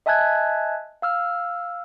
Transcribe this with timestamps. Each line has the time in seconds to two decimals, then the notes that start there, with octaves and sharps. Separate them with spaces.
0.06 D#5 E5 G#5 A5 F#6 G#6
1.02 F5 E6 F6